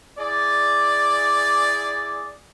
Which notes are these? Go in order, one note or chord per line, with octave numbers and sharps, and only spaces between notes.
E4 G#4 D5